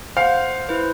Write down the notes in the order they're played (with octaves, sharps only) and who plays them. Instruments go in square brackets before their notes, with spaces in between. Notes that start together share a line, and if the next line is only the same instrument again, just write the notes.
[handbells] C5 F#5 [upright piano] F5
[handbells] E4 B4 C5